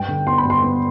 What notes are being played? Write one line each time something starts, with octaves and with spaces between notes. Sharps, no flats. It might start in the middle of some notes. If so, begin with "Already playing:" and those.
Already playing: G2 G5
D3
B3 C6
B5
G2 C6
B3